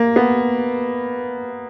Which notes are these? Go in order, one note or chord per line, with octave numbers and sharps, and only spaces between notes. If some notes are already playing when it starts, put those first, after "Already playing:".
Already playing: A#3
B3